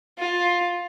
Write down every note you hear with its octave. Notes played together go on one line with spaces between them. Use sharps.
F4